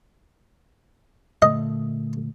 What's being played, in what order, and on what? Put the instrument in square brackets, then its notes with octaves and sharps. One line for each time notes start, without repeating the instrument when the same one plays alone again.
[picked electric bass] A#2 D3 A3 [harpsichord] D#5